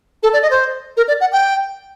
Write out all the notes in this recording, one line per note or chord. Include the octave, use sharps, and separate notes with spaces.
A4
D5
D#5
C5
A#4
D5
F#5
G5